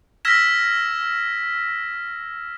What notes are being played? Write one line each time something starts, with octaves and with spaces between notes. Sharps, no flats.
E6 F6 G#6 A#6 B6 E7